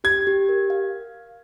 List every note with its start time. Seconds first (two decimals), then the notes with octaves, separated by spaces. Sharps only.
0.04 G4 G#6
0.27 G4
0.49 A#4
0.70 F5